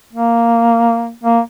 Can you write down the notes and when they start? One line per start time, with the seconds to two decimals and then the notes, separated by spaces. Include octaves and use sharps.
0.13 A#3
1.24 A#3